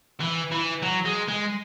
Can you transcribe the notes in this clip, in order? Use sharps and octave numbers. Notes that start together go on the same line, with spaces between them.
E3
E3
F#3
G#3
G#3